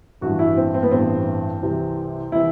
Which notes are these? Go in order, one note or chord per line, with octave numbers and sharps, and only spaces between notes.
A1 G2 E3 F#4
E4
C4
C4
B3
A1 G2 E3 C4
C2 C3 E3
C3 E3 E4